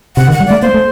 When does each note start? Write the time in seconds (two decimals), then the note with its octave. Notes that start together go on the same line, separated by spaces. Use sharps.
0.16 C3 F#5
0.28 D#3
0.32 F#5
0.40 G3
0.47 A3 D5
0.62 A#3 C5
0.74 A3